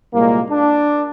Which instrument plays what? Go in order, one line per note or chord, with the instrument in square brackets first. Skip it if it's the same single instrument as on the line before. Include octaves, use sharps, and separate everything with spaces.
[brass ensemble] C2 A#2 G#3 A#3
D4